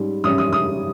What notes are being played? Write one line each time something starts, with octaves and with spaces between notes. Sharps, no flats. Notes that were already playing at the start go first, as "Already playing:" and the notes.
Already playing: G#2 G3 C#4
G#2 G3 C#4 D#6
D#6
D#6